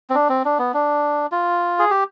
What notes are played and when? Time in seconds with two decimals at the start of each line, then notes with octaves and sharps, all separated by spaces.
0.10 C4
0.15 D4
0.29 C4
0.45 D4
0.59 B3
0.74 D4
1.32 F4
1.79 G#4
1.91 G4